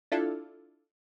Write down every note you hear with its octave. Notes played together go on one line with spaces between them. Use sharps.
D4 E4 F4 A4